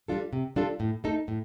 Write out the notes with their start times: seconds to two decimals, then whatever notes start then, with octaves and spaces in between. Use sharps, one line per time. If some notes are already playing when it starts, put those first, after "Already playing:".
0.08 G3 D4 F4 A4
0.33 C3
0.56 G3 D4 F4 A4
0.80 A2
1.04 A3 D#4 A4
1.28 A2